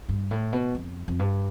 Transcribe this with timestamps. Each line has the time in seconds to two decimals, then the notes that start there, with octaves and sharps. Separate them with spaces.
0.09 G2
0.31 A2
0.53 B2
0.75 F2
1.08 F2
1.19 G2